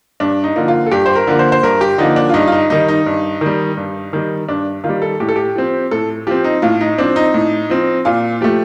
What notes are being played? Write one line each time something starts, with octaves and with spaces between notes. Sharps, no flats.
G2 D4
D#4
D3 F3 A#3
F4
A4
G2 G4
C5
A#4
D3 F3 A#3
C5
C5
G2 A#4
G4
D3 F3 A#3 D#4
D4
F4
G2 D#4
F4
D#4
D#3 G3 D#4
D#4
G2
D#3 G3
G2
D#3 G3
G2 D4
D#3 F4
G3
A4
A2 G4
A4
G4
F3 C4
A2 A4
F3 C4 G4
D#4
A2 F4
D#4
F3 C4 D4
D#4
A2
F3 C4
A#2 F4
F3 A3 G4